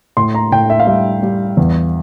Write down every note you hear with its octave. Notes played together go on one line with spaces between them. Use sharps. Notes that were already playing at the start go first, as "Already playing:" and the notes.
A2 C6
A#5
A2 G5
E5
F5
G3 E5
G3
E2